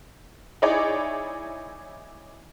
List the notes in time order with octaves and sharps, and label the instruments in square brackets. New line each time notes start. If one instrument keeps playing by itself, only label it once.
[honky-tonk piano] D#4 E4 G#4 C#5 D5